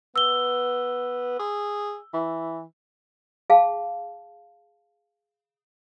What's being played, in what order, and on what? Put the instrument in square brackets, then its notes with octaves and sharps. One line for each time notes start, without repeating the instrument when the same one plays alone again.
[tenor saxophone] B3 [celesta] E6 G7
[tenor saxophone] G#4
E3
[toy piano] G#4 F5 A5